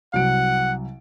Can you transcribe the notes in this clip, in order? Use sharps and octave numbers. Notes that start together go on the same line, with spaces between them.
C2 F#3 F#5 D7